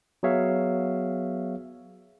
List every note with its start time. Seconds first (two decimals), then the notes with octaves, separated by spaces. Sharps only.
0.23 F#3 B3 G#4 C#5 E5 F5